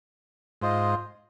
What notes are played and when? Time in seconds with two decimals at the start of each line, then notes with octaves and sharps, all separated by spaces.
0.61 G#2 F4 C5 D#5